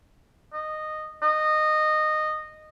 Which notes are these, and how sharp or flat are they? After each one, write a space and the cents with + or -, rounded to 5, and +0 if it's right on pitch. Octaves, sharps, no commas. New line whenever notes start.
D#5 -10
D#5 -15